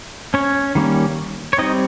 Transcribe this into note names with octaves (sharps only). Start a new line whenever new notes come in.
C#4 C#5
D#3 G3 A#3 C#4
C#5
G3 C4 D#4 D#5